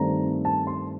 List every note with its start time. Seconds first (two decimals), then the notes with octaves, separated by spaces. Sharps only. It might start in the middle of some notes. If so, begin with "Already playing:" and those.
Already playing: G2 D#3 A3 C4 A#5
0.45 A5
0.67 C6